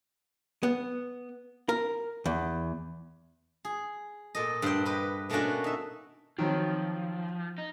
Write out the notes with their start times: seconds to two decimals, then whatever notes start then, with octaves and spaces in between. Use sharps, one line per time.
0.63 B3
1.69 A#4
2.26 E2
3.65 G#4
4.35 A#2 A4 D#5
4.62 G2 C5 F#5 G5
4.85 G4 B4 D#5
5.30 B2 A3 A#3 C#4 D4 F#4
5.64 D#4 E5
6.39 D#3 F3 F#3 C4
7.58 D#4